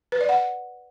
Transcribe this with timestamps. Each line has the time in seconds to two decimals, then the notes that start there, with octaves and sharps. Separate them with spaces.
0.12 B4
0.21 D5
0.29 F#5